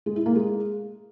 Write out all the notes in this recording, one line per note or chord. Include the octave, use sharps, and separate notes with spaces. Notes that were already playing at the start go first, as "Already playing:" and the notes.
G#3
E4
A#3
G#3